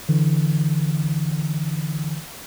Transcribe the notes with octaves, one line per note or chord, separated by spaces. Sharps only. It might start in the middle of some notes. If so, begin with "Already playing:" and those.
D3 E3